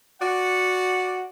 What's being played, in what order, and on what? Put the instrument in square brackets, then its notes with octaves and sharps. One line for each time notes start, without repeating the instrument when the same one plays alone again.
[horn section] F#4 D5 F#5